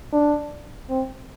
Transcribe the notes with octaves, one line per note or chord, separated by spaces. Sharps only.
D4
C4